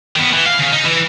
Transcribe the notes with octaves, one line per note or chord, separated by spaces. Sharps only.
D#3 B3
E3
F5
C#3
D#4
E3